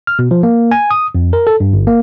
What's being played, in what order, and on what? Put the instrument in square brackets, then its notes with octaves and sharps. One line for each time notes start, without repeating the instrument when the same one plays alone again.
[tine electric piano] F6
B2
F3
A#3
G#5
D#6
F2
A#4
A4
G2
G1
A#3